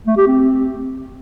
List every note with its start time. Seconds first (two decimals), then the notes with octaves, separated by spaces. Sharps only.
0.07 A3
0.17 G4
0.27 C4